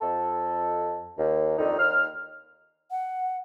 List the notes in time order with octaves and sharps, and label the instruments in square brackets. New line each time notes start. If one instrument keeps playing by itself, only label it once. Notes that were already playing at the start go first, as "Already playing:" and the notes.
[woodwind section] F2 A4
D#2
F2 D3 D#3 D#4
D#2 F6
[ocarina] F#5